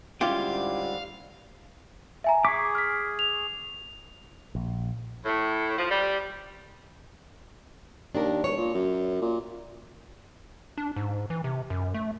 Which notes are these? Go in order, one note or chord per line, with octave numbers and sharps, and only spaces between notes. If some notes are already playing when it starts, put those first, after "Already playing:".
G#2 D3 G3 C#4 E4 F4 G4 F5
E5 G#5 A#5
G#4 C#6 D6 B6
F6 B6
F7
A#1
A2
F3
G3
D#2 D4 A#4
E1 C#5
A#2
F#2
A#2
D4
G#2
E3
C3
F#2
A3